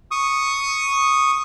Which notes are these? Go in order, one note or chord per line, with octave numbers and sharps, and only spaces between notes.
C#6 D#6